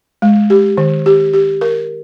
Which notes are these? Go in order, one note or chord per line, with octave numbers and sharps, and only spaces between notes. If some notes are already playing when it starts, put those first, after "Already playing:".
G#3
G4
D#3
G4
G4
A#4